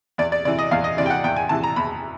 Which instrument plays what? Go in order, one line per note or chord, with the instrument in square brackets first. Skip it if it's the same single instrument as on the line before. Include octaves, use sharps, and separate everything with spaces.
[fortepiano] E2 D5
D5
C3 E3 D5
D#5
E2 F5
D#5
C3 E3 D5
G5
F#5
E2 G5
G#5
C3 E3 A5
A#5
E2 B5